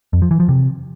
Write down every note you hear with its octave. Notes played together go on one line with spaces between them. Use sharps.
F2
F3
E3
F3
C3